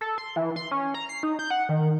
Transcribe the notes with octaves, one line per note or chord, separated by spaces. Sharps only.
A4
C6
E3
C6
C#4
A#5
C7
D#4
G6
F#5
D#3